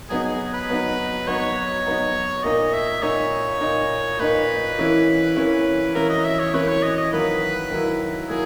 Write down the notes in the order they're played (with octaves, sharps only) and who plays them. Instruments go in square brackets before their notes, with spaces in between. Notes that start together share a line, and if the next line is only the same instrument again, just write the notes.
[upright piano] F#3 B3 D#4 [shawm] G#4
[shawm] G#4
B4
[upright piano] F#3 B3 D#4
[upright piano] F#3 B3 D#4 [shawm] C#5
[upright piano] F#3 B3 D#4
[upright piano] A#2 A#3 D#4 [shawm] D#5
[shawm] E5
[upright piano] A#2 A#3 D#4 [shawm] C#5
[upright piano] A#2 A#3 D#4
[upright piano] A#2 A#3 D#4 [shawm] B4
[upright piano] E3 A#3 C#4 E4
E3 A#3 C#4 E4
[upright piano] E3 A#3 C#4 E4 [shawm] A#4
[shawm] D#5
E5
C#5
[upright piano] E3 A#3 C#4 E4 [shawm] B4
[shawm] C#5
D#5
D#5
[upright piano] D#3 F#3 A#3 E4 [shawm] B4
[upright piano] D#3 F#3 A#3 E4
[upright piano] F#3 A#3 E4 [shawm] G#4